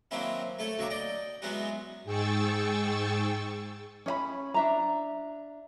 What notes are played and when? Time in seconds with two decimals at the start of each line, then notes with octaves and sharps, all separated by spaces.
0.11 D#3 F#3 A#3 C4 C#4 E4
0.59 A3 A4 C#5
0.78 D2 F#3 A#3 C#5 E5 D6
0.90 D5 D#5 G5
1.42 E3 F#3 G#3 B3 C#4 F#4
2.04 G#2 G#4 G5 C#6 E6 A6
4.06 C#4 D#5 B5
4.54 D4 E5 A#5